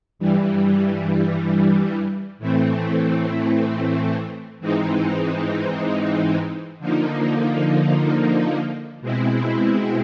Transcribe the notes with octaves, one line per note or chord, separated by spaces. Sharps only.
G2 E3 G3
A2 E3 A3 C4
G#2 E3 G#3 C4 D#4
D3 F3 A#3 D#4
B2 G#3 C4 E4